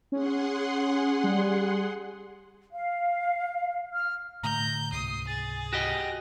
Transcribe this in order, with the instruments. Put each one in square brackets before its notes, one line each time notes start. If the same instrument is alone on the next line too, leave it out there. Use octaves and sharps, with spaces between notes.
[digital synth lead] C#4 [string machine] G#4 F#5 C6
[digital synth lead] G3
[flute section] F5
F6
[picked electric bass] A2 D3 A3 [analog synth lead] A#5 [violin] G6
[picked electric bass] C#2 G#2 C3 [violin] D#6 [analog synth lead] C7
[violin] G#4 [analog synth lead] A6
[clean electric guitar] F#4 G4 D#5 [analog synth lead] A#6